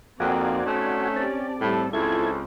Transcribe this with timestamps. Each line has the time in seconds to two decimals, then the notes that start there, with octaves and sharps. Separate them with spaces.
0.20 F2 A#3 C4 D#4 F#4 D5 F#5 G#5
0.66 A3 C#4
1.16 C4 G4 D5 A5
1.61 A2 G3 A4
1.93 C#2 C4 E4 F4 A4 G#6